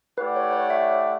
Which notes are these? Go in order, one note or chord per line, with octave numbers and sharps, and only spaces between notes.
A3 E4 G4 B4 D5 F#5
C#5
C#5
E5